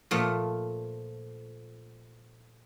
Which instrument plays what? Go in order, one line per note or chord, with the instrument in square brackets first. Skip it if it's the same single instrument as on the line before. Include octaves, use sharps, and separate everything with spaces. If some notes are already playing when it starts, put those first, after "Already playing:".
[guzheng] A#2 F3 A3